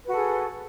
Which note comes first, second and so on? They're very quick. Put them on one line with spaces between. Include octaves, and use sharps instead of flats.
B4 F#4 A4 G#4